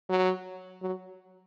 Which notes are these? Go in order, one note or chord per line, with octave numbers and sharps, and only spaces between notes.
F#3
F#3